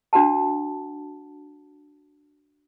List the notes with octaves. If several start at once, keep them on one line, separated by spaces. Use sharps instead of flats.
D4 F#4 F#5 A5